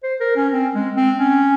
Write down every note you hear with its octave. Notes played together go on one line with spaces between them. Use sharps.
C5
A#4
C#4
C4
G#3
C4
C#4